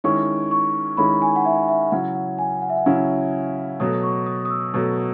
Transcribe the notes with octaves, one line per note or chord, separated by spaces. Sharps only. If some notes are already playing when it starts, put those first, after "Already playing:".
D#3 G#3 C#4 E4 C#6
C#6
D#3 G#3 C#4 E4 B5
G#5
F#5
E5
E5
C#3 F#3 C#4 E4 F#5
F#5
G#5
F#5
E5
F#5
C#3 F#3 C#4 E4
B2 F#3 A3 D#6
C#6
D#6
D#6
E6
B2 F#3 A3